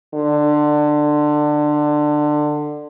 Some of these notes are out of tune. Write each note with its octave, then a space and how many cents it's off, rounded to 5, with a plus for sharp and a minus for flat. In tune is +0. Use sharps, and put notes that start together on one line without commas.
D3 +20